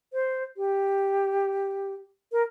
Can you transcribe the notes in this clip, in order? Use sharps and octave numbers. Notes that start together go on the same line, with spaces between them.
C5
G4
A#4